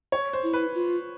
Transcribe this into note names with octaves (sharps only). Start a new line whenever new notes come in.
C#5
C5
E4
B4
F4